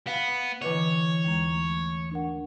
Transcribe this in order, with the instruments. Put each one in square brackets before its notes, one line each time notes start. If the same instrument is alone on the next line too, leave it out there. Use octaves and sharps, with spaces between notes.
[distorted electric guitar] B3 [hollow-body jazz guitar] F5
[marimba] D3 D6 [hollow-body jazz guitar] E3 B4 D#5 [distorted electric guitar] C#5
[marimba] D#2 G#3 A#5
A3
D4 A#4 F#5